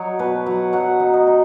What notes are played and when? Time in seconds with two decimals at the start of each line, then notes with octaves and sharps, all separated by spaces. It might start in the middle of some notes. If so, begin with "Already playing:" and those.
Already playing: F#3 D#4 C#5 D#5
0.19 B2 B4
0.46 F#3 F#5
0.73 F#3 F#5
1.00 D#4
1.14 D#5
1.27 D#4